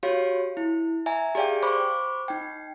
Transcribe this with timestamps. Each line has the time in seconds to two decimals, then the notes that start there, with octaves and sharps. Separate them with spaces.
0.03 F#4 G4 C#5 F5
0.57 E4
1.06 E5 G#5 A#5
1.35 G4 G#4 D5 F5 G5
1.63 C5 B5 C#6 D6
2.28 D#4 G5